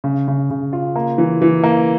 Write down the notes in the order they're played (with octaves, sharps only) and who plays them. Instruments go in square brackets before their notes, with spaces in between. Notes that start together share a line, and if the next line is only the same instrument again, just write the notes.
[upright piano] C#3
C#3
C#3
F4
A#3
E3
E3
A#3